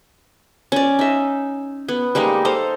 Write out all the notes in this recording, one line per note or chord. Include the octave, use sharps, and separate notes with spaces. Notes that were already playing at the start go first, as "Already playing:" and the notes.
C#4 D5
D#4 E5
B3
G3 G#3 A#3 D#4
D#4 A4 C5 F5